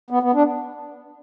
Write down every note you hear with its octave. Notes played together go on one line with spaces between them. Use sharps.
B3
B3
D4